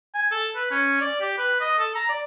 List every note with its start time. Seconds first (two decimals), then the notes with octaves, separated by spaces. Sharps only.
0.14 G#5
0.31 A4
0.56 B4
0.71 C#4
1.01 D5
1.21 G4
1.38 B4
1.61 D#5
1.79 A4
1.95 A#5
2.09 D5